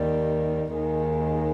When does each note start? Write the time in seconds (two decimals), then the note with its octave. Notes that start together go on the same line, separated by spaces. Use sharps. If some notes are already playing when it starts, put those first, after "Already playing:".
Already playing: D#2 D#3 G3
0.73 D#2 D#3 G#3